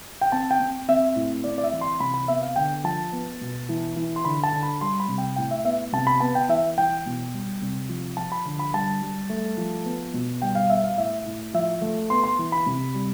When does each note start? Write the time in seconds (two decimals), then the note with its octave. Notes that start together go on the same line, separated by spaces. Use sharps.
0.21 G5
0.32 C4 A5
0.51 G5
0.60 C4
0.88 C4 E5
1.16 A2
1.44 C4 D5
1.58 D5
1.63 E5
1.73 E3
1.81 C6
2.00 C3 B5
2.14 B5
2.28 B3 E5
2.42 F5
2.56 D3 G5
2.84 F3 A5
3.12 B3
3.41 B2
3.69 E3
3.96 E3
4.16 C6
4.25 D3 B5
4.44 A5
4.52 D3
4.63 B5
4.81 G3 C6
5.00 B5
5.08 C3
5.18 G5
5.36 A2 G5
5.51 E5
5.65 B3 E5
5.92 C3 A5
6.07 B5
6.20 B3 A5
6.35 G5
6.49 E3 E5
6.78 E3 G5
7.06 B2
7.34 G3
7.62 C3
7.89 F3
8.17 F3 A5
8.32 B5
8.45 D3
8.59 B5
8.73 G3 A5
9.02 G3
9.30 A3
9.57 F3
9.85 B3
10.14 B2
10.42 G3 G5
10.55 F5
10.70 B3 E5
10.84 F5
10.98 A2 E5
11.26 A2
11.54 F3 E5
11.82 A3
12.10 B3 C6
12.24 C6
12.39 E3
12.52 B5
12.66 C3
12.94 G3